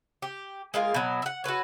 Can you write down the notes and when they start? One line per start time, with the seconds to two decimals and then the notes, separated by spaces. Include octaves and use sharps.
0.22 G4
0.74 G#3 A#3 F4
0.94 B2 F#3
1.22 E5 F#5
1.44 F#4 A4 B4 C#5